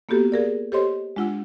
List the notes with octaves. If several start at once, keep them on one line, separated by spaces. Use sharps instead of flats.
A#3 B3 F#4 G4 A4
G#4 A#4 D5
G4 A4 C5 C#5 D#5 C6
G#3 D4 F4 F#5 E6